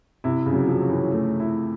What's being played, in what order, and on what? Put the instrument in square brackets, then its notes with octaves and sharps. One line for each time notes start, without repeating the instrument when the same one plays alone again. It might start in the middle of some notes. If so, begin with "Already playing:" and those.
[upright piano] C3 [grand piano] E4
[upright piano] C#3
[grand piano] F#3
[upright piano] F3
[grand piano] C#4
[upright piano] E3
[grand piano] A3
E4